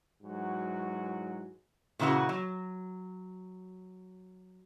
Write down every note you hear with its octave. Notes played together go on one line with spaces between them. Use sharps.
G#2 E3 F#3 F#4
A#2 C#3 E3 E4 F#4
F#3